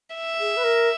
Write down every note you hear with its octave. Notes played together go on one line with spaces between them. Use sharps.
E5
G#4
B4
A#4